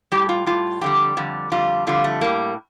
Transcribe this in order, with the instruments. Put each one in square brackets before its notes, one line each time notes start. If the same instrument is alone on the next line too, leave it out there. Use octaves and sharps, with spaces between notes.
[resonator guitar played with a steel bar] A2 G3 G4
F4
A2 G3 F4
F2 D3 G3 G4
F2 D3 G3
F2 D3 G3 F4
F2 D3 G3 F4
A3
A2 G3 A#3